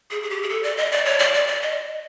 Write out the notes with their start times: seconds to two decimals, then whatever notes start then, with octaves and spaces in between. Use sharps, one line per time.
0.11 G#4
0.23 G#4
0.30 G4
0.42 G#4
0.49 A4
0.63 D5
0.77 D#5
0.91 D5
1.05 C#5
1.19 D5
1.34 D5
1.47 D5
1.62 D#5